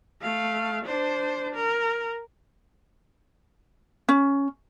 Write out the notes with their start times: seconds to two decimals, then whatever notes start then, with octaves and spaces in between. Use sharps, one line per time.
0.22 A3 F5
0.85 D4 C5
1.55 A#4
4.09 C#4